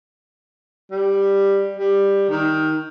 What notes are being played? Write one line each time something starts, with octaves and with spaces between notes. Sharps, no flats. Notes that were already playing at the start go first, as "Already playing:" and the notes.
G3
G3
D#3